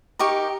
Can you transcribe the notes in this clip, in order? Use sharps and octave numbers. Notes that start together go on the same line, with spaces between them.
D#4 G4 A#4 C#6